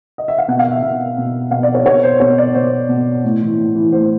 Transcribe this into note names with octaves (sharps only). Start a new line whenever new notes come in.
D#5
E5
F5
B2 F#5
F5
E5
B2 E5
B2
B2 F5
D5
C#5
B2 C#5
C5
B2 C#5
D5
B2 C5
B2
A2
E3
A2
E3
A2 C5